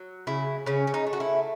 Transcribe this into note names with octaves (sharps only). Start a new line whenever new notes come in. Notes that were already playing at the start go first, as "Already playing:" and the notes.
Already playing: F#3
C#3 E4
C#3 C#4
C#4
D#4
A3
F#4
E4